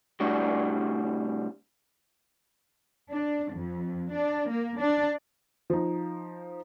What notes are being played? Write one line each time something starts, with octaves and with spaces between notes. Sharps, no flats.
C2 A2 G3 D4 F#4
D4
F2
D4
A#3
D4
F3 D#4